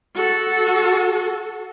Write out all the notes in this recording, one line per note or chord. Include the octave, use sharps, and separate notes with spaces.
F#4 A4